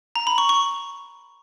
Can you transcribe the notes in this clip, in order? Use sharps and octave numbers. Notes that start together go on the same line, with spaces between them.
A#5
B5
C#6
C#6